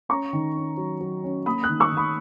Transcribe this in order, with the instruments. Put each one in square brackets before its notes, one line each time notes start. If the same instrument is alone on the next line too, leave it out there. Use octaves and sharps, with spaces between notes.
[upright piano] C#4 A#5 C#6
D#3
C#4
F#3
F#3
C#4
A#3 B5 D#6
D#6 F#6
D#3
C#6 E6
D#3
B5 D#6